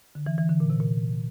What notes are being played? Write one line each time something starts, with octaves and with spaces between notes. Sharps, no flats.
D3
E3
E3
D3
A#2
C3
A#2